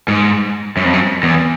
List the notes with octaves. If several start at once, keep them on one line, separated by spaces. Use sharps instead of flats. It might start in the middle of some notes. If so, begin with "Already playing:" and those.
G#2
F#2
F2
F#2
E2